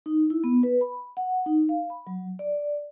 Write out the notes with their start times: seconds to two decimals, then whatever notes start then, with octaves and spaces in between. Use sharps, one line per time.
0.06 D#4
0.30 E4
0.44 B3
0.63 B4
0.81 B5
1.17 F#5
1.46 D#4
1.69 F5
1.90 B5
2.07 F#3
2.39 D5